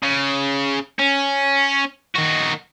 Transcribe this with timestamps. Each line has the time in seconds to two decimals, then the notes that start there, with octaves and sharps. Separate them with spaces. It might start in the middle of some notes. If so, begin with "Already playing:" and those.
0.03 C#3
0.99 C#4
2.15 D#3 F#4